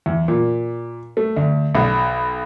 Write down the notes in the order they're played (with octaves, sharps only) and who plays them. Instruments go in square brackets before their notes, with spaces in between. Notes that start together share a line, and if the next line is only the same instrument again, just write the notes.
[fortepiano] E2
A#2
A3
D2
B1